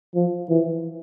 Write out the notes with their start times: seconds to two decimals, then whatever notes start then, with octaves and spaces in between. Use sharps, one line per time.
0.15 F3
0.49 E3